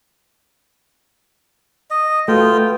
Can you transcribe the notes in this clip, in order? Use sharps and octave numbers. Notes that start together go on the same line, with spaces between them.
D#5
A3 F4 F#4 B4 G5